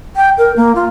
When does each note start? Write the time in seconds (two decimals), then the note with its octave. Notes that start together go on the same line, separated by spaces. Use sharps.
0.16 G5
0.38 A#4
0.57 A#3
0.75 F4